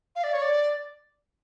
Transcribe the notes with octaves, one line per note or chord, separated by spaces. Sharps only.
F5
D5
C#5
D5